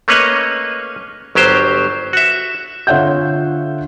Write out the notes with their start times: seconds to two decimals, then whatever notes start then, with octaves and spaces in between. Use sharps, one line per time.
0.08 A3 A#3 C#4 B4 C#5 D#5
1.35 G1 F#3 G4 C5
2.13 F#4 E5
2.87 D3 F4 C#5 E5 F#5 G6